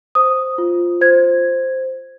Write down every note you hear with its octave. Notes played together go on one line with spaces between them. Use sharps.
C5 D#6
F4
C5 G#6